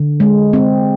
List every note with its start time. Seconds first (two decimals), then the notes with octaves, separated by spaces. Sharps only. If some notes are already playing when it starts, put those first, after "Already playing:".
Already playing: D3
0.20 G#3
0.53 C4